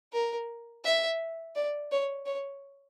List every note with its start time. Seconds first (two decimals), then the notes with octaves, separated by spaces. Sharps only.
0.13 A#4
0.84 E5
1.56 D5
1.92 C#5
2.26 C#5